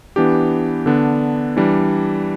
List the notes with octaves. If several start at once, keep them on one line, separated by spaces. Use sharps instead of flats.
E3 B3 D4 G4
D3 B3 D4
E3 G3 D4